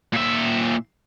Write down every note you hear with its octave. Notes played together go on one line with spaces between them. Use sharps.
A#2 E5